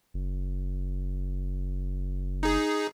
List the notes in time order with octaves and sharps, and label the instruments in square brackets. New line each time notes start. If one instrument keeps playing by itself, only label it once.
[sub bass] F#1
[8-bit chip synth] D#4 G#4